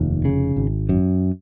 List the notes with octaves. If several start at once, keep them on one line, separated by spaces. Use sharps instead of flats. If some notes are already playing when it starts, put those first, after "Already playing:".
Already playing: F1 D#2
C#3
G#1
F#2